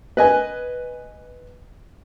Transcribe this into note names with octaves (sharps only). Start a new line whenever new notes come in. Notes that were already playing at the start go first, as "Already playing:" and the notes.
B4 D#5 G#5